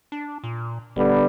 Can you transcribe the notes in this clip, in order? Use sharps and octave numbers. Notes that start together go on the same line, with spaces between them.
D4
A#2
D#1 D3 G3 B3